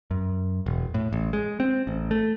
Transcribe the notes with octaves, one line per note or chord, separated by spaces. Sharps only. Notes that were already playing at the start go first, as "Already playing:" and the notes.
F#2
E1
A2
A1
G#3
C4
A1
A3